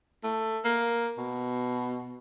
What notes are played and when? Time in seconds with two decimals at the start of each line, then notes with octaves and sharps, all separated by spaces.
0.24 A3
0.65 A#3
1.18 B2